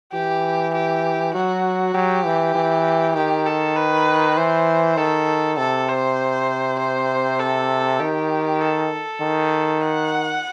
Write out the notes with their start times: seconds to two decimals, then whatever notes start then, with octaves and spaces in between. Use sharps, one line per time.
0.13 E3 G4
0.74 G4
1.34 F#3 F#4
1.94 F#3 G4
2.25 E3
2.55 E3
3.15 D#3 G4
3.46 A4
3.76 B4
4.37 E3 C5
4.97 D#3 A4
5.58 C3 A4
5.88 C5
6.78 C5
7.39 A4
8.00 D#3 G4
8.61 A4
9.20 D#3
9.81 F#5